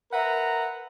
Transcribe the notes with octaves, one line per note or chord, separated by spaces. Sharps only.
A#4 B4 E5 F#5 A#5